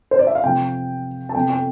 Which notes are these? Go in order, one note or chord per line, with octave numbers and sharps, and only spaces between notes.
C5
D5
E5
F5
F2 C3 F3 G5
A5
F2 C3 F3 B3 G5
G5